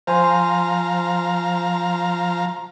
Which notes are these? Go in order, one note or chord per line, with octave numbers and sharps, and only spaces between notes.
F3 C5 F5 G#5 A#5 C6